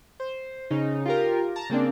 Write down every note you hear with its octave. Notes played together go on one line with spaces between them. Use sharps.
C5
C#3 D#4
F4 G4 A#4
A5 A#5
C#3 A#3 C4 D4